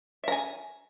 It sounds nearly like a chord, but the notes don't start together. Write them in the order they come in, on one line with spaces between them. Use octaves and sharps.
E5 A#5 G#5